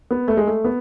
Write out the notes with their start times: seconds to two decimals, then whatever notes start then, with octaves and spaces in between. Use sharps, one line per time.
0.11 B3
0.28 A3
0.37 G#3
0.47 A3
0.65 B3